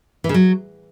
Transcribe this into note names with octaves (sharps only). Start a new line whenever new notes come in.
E3
C#3
F#3